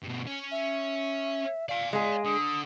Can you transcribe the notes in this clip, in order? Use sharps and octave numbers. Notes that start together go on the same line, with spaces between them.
G2 B2
C#4
E5
D5 F5 G#5
G#3 G#4 F5
D3 D#6